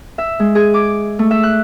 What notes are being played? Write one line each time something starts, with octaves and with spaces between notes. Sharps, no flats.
E5
G#3
G#4
D6
A3
E5
F#6